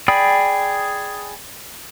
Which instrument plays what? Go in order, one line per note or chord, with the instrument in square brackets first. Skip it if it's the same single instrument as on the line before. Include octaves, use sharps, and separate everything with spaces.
[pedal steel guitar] G#4 D5 G5 B5 D#6